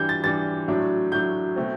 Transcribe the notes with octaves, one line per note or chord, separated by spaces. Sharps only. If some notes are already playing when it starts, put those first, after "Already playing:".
Already playing: E3 G3 D4 G6
A6
E3 G3 D4 A6
A2 F#3 A3 D4
A2 F#3 A3 D4 G6
B2 A3 C4